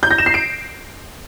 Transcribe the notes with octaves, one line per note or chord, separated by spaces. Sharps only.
G6
A#6
E7
C7
D7